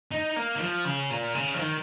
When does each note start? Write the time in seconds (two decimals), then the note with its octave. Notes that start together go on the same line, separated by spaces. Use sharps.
0.11 D#4
0.36 A#3
0.56 D#3
0.61 F3
0.85 C#3
1.10 A#2
1.34 C#3
1.54 F3
1.59 D#3